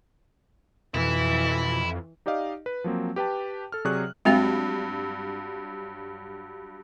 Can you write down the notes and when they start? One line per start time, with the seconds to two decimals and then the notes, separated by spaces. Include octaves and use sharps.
0.94 F2 B2 E3 E4
2.26 D#4 G4 D5 D#5 F5
2.66 B4
2.84 F3 F#3 A#3 C4
3.16 G4 B4 G5 A5
3.72 A4 F6
3.85 C3 F#3 G#4 D5 C#6 F#6
4.25 G2 F#3 G#3 C4 F5